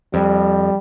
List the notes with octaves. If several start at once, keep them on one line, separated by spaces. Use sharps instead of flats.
F2 G3